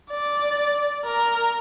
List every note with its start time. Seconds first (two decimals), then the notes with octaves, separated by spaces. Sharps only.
0.11 D5
1.06 A#4